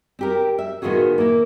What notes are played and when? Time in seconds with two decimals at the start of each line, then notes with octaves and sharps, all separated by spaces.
0.19 C4 G4 A#4
0.59 E5
0.82 A2 D#3 B3 F4 F#4 G#4
1.18 A#3 E4